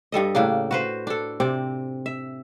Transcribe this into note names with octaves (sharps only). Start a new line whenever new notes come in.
G2 G3 A4 D#5
A2 C#3 A#3 D4
F#4 B4 C5
D4 A4
C3 C4 D5
E5